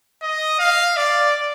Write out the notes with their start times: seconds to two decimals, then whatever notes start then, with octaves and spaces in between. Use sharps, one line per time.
0.22 D#5
0.59 F5
0.97 D5